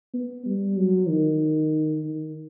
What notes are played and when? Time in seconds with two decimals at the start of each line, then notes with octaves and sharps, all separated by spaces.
0.14 B3
0.46 G3
0.77 F#3
1.09 D#3
2.04 D#3